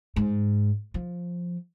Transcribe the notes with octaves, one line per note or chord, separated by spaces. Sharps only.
G#2
F3